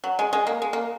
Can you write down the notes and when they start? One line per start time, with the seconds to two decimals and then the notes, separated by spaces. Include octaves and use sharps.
0.04 F#3
0.19 G#3
0.33 G#3
0.47 A#3
0.62 G#3
0.73 A#3